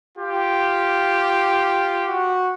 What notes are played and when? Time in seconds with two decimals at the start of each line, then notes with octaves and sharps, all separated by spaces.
0.18 F4 G4
2.07 F#4